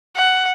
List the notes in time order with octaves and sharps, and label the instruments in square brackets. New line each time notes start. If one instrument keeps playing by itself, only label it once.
[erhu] F#5